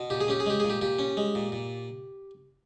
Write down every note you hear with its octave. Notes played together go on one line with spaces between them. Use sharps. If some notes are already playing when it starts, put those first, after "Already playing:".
Already playing: B2
A#2 G4
G#4
C#4 G4
G#4
G#3 G4
A#2 G#4
G4
A#2 G4
C#4
G#3
A#2
A#2